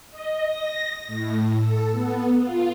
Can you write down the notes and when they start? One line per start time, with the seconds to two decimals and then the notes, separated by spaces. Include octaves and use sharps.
0.11 D#5
0.49 A#6
1.07 A2
1.56 A4
1.92 B3
2.42 F4